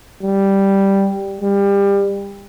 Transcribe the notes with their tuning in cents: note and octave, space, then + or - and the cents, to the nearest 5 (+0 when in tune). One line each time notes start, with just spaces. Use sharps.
G3 +0
G3 +25